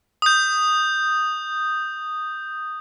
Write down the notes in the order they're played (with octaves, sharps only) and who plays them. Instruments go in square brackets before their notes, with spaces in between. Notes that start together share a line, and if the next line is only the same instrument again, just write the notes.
[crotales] D#6 G6